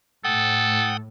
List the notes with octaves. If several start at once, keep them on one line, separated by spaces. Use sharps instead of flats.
A2 A4 F#5 G5 D#6